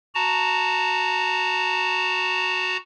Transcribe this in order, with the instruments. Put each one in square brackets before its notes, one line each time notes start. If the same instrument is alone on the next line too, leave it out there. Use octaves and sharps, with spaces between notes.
[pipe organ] F#4 A5 A#5